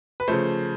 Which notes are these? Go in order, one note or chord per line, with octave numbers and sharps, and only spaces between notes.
B4
C#3 F3 A3 C5